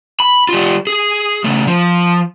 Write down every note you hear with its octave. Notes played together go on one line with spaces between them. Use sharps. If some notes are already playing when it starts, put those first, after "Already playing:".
B5
G3 F4
G#4
C#3 A3
F3